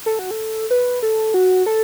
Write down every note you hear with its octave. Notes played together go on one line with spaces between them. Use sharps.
A4
F#4
A4
B4
A4
F#4
A4